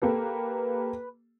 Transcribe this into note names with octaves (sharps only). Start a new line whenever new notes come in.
A#3 G4 A4 B4